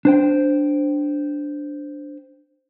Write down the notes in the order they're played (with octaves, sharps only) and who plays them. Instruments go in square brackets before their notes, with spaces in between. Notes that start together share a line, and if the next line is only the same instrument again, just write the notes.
[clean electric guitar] D4 C5 G5